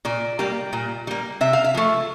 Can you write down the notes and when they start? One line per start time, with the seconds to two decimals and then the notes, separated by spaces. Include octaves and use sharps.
0.05 A#2 D5
0.39 G3 A#3
0.73 A#2
1.07 G3 A#3
1.41 C3 E5
1.53 F5
1.64 E5
1.75 F3 A3